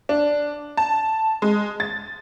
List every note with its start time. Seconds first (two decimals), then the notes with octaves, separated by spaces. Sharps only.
0.09 D4
0.77 A5
1.42 G#3
1.80 A6